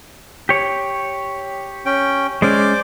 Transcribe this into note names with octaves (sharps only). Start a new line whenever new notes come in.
G4 C#5
C#4 G5
G#3 C#4 C5 D5 D6